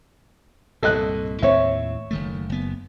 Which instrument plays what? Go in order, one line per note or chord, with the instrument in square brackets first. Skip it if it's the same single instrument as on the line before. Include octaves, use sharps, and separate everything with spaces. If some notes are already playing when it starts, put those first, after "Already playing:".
[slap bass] C2 G2 A#2 [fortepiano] A4 D#5 F#6
[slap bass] D#2 A2 C4 [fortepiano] C#5 E5
[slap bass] F#1 D#3 A3
F#1 B3